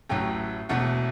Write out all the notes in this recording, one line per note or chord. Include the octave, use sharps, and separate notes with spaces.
A1 A2 F#3 A3 G5
E1 E2 B2 A3 F#5